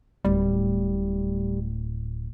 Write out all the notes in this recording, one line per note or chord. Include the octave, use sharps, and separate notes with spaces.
D1 A2 G3